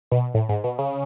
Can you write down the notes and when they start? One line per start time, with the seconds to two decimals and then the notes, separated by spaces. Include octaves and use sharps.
0.11 B2
0.34 A2
0.49 G#2
0.64 B2
0.79 C#3